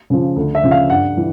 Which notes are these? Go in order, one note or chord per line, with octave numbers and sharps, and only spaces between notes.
C#3 F3
D2
E5
C#3 F3
F5
G2 F#5
E3